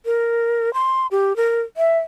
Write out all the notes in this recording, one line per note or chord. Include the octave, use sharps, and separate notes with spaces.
A#4
C6
G4
A#4
E5